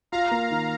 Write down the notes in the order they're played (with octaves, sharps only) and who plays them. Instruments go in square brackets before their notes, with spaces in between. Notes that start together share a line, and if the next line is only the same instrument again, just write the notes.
[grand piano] F4 [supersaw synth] F5 A#5
[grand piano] A#3
D#3